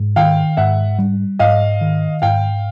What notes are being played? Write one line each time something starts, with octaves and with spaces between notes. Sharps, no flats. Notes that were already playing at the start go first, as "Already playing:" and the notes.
Already playing: G#2
D#3 F5 G5
G#2 E5 F#5
G3
G#2 D#5 F5
D#3
G#2 F5 G5